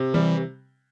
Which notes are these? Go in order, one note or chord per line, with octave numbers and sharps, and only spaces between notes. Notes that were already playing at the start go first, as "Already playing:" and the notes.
Already playing: C3
E3 G3